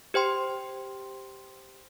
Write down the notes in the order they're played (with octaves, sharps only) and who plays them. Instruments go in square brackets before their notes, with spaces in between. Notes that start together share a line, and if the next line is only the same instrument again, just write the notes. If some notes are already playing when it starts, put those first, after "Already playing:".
[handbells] G4 C5 G5 C6